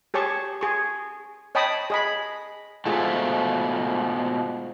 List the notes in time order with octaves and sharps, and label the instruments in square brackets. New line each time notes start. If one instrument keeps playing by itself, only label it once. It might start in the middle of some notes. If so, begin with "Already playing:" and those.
[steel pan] G4 G#4 C#5 A5 C#6
G#4 C#6
C#5 D#5 G5 A5 B5 D#6
G#4 D#5 B5
[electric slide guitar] G#2 B2 A3 [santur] F4 G#4 C5